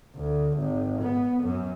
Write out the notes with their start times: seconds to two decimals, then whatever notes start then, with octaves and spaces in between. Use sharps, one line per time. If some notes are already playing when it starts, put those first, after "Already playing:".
0.16 D2
0.58 G#1
1.01 B3
1.44 F#2